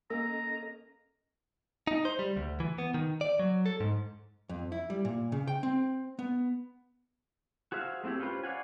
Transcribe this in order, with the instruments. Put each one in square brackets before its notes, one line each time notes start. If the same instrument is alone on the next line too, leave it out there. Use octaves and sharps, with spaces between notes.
[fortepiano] A#3 [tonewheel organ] C#4 A4 D#5 [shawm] A#5
[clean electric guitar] D#4
C5
G3
D2
E3
B3
D#3
D5
F#3
A4
G#2
[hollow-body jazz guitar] F2
E4
G3
A#2
C#3
G5
C4
B3
[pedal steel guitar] F#4 G#4 C5 E5 F5
A3 C4 E4 G4 G#4
C#4 F4 G4 B4 C5
C#5 D5 F5 F#5 G#5